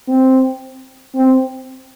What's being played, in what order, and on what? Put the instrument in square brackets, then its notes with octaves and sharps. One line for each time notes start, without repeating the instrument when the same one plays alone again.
[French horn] C4
C4